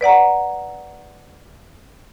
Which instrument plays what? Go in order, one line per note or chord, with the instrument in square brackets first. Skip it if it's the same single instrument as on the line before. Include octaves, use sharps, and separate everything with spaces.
[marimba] B4 D5 F#5 A#5